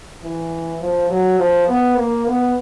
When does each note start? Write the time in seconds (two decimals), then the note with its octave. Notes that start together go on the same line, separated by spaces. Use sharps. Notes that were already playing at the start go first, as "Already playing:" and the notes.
0.23 E3
0.81 F3
1.11 F#3
1.39 F3
1.68 B3
1.97 A#3
2.26 B3